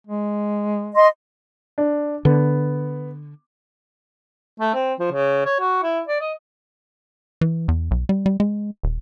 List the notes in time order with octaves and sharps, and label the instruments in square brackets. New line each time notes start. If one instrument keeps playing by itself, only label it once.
[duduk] G#3
[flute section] D#5 C6
[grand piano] D4
[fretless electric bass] D3 [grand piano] B3
[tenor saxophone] A3
C4
F3
C#3
C#5
F#4
E4
D5
D#5
[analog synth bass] E3
E2
B1
G3
G3
G#3
D#1